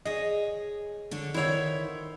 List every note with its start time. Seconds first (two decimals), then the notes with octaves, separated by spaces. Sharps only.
0.05 G#4 C#5 D#5
1.11 D3 D4 C#5
1.34 D#3 E4 C5 C#5 F#5